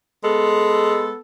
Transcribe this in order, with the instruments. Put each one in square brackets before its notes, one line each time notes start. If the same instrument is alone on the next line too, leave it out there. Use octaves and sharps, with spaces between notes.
[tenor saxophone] G#3 [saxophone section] B3 A4